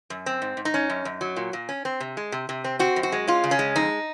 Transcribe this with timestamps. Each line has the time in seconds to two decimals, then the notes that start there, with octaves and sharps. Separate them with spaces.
0.10 F#2
0.26 C4
0.42 G#2
0.57 G#2
0.65 D#4
0.74 C#4
0.90 F#2
1.05 F#2
1.21 F#3
1.36 A#2
1.53 A#2
1.69 C#4
1.85 C4
2.00 C3
2.17 G#3
2.32 C3
2.49 C3
2.64 C4
2.79 C4 F#4
2.96 F#2
3.03 F#4
3.12 G#3
3.27 C#4 F4
3.44 C#3
3.51 C#4
3.59 G#3
3.76 F2 D#4